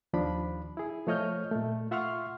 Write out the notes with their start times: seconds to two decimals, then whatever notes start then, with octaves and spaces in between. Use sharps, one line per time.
0.13 D#2 F3 D4 B5
0.77 E4 G#4
1.07 F3 A3 C#5 D#5 F6 G6
1.51 A#2 A3
1.91 F4 E5 F#5 C6 C#6 F6